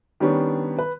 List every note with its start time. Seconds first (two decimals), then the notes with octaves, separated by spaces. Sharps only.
0.20 D#3 G3 B3 C#4 D4
0.79 B4